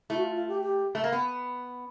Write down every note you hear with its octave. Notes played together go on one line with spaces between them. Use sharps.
A3 E4
F#4
F4
F4
G4
G4
A3
A#3
B3